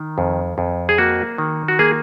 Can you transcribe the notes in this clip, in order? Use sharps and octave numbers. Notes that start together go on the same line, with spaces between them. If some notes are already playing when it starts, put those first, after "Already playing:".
Already playing: D#3
F2
F2
G#4
A#3 F#4
D#3
F#4
A#3 G#4